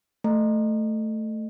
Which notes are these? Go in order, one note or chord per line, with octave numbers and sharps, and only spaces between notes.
A3